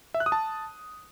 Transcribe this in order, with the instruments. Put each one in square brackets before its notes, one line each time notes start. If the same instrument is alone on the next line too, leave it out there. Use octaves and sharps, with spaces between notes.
[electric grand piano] E5
F#6
D#6
A5